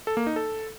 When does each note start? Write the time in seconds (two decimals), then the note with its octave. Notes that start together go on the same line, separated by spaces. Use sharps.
0.07 A4
0.17 A#3
0.27 D#4
0.36 A4